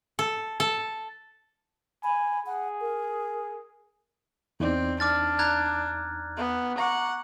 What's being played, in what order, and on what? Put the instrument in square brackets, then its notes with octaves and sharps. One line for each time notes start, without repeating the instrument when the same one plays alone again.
[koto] A4
A4
[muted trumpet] G#5 [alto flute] B5
[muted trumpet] G#4 [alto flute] F#5
[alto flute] A#4
[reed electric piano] E2 D#4 D5 [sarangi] C4
[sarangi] D4 [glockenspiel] D6 F6 A6
[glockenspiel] A#5 F#6 G#6
[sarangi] B3
[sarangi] F#5 [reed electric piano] A#5 C#6 D6